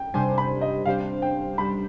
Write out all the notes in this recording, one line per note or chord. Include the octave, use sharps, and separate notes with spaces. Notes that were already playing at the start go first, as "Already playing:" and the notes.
Already playing: G5
C3 G3 D4 G4 C5 G#5
B5
D#5
C3 G3 D4 G4 C5 F5
G5
C3 G3 D4 G4 C5 B5